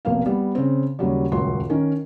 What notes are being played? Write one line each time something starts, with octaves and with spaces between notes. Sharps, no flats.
F1 B1 A#3 F5
G3 B3
C#3 C4
D#2 C#3 F#3 G3
D#1 C#2 F#2 F#4 C6
D#3 C#4 A#4